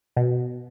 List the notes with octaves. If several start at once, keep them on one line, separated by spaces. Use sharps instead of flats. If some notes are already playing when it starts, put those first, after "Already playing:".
B2